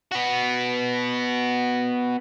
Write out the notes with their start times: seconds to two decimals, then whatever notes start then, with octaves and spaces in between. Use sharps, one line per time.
0.12 B3 F#4